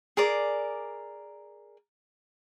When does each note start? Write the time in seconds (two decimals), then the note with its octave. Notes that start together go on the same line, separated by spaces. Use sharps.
0.17 G#4 A#4 D5